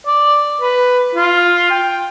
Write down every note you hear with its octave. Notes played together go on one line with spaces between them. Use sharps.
D5
B4
F4
G5